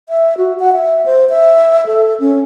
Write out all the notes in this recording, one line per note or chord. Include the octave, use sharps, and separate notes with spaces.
E5
F#4
F#5
E5
C5
E5
A4
C#4